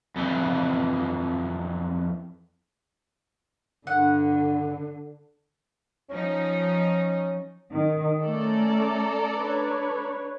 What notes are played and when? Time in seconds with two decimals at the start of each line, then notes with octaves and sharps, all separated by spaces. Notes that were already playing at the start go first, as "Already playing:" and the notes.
0.16 F2 E3
3.87 G2 D3 F#5
6.10 F3 C#4 D#4
7.72 D#3
8.23 A3 C#4 A4 D5 A#5
9.34 D4 B4 C#5